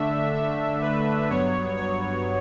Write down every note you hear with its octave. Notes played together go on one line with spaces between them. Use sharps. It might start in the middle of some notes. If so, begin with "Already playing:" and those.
Already playing: D3 A3 D4 E5
E5
B4
G2 F#3 B3 C#5
C#5